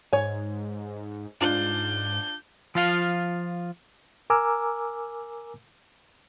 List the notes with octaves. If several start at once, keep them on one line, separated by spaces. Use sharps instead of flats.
G#2 C#5 G#5
G#2 D4 F4 G6
F3 F4 F5
A#4 G#5 A#5 D6 E6 F6